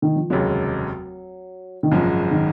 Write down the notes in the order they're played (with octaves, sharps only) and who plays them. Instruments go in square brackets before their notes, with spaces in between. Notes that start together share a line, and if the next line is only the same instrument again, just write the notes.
[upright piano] D#3
F3
[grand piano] F1 D#2 C#3 G#3 [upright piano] F#3
[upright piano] D#3
[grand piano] G#1 F#2 C#3 G#3 [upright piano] F3
[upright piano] D#3